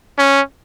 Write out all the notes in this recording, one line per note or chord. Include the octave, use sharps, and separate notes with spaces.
C#4